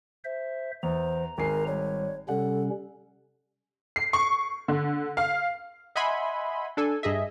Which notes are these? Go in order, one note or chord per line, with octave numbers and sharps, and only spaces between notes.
C5 E5
E2 C5 A#5
G#1 A#4 G#5 C7
G3 C#5
C3 G3 C#4 A4 F#5
C7
C#6
D3
F5
D#5 E5 F#5 G#5 B5 C6
D4 A4 G#5
G2 G#4 D#5 E5